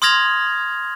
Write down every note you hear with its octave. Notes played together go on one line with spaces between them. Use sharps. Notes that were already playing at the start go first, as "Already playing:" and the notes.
C6 D#6 F6 G#6 A#6 F7